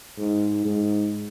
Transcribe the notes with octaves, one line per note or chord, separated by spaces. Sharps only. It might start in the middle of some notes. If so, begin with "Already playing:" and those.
G#2
G#2